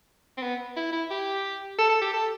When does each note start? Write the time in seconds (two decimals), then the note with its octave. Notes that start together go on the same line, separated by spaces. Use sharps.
0.37 C4
0.43 B3
0.77 E4
0.93 E4
1.11 G4
1.79 A4
1.90 A4
2.02 G4
2.14 A4